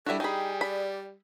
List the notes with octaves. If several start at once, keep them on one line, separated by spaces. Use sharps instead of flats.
G3 D4 E4 F#4 A4 E5
G3 D#4 G#4 G5 G#5 B5
D5 B5